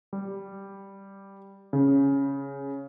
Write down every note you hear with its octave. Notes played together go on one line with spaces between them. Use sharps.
G3
C#3